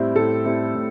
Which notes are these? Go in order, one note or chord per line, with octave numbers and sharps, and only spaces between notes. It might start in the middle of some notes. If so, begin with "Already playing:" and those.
Already playing: A2 G3 C4 E4
A2 A4
G3 C4 E4
A2